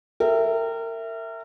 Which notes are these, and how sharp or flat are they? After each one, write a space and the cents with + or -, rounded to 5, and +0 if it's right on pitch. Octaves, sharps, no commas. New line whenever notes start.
A#4 -30 E5 +0 G5 +0